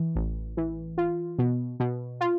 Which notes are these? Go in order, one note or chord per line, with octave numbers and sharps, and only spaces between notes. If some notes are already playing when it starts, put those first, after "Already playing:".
Already playing: E3
A1
E3
F4
B2
B2
F4